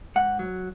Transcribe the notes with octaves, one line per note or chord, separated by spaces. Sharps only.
G#2 F#5
F#3